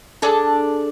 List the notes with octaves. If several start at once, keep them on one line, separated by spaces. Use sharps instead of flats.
D4 G#4 A4